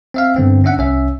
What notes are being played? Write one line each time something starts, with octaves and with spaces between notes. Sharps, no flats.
C4 E5 F5
G2 D3 B3 C4
C#4 D4 E5 F#5
C2 C#4 E5